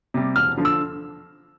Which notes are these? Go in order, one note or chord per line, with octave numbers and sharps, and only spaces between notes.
C3 G3
E1 F6
D3 F3
E6